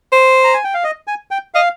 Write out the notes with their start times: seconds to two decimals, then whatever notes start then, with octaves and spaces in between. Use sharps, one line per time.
0.12 C5
0.44 A#5
0.54 G#5
0.64 G5
0.74 F5
0.84 D#5
1.07 G#5
1.31 G5
1.54 D#5 F5